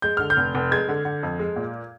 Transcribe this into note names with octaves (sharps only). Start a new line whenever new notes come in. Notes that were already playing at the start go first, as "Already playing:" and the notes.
G#3 G6
D3 F6
G6
F1
F1
G#3 G#6
D3
D3
F2
G#3
A#2